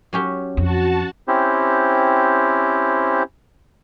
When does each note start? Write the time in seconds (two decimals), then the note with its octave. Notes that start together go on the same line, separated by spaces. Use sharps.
0.13 F#3 C#4 G4
0.57 F2 F#4 A5
1.28 C4 C#4 E4 G4 C5